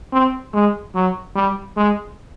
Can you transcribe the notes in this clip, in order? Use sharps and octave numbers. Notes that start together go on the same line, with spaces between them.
C4
G#3
F#3
G3
G#3